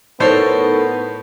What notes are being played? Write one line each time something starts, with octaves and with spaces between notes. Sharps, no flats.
A2 B3 D#4 A4 A#4 C5 C#5